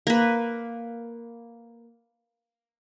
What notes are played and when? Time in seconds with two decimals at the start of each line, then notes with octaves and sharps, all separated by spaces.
0.07 A#3 B4